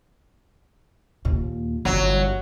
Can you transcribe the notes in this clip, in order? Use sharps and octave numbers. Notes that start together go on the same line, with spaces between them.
D#2 A#2
G1 E3 F#3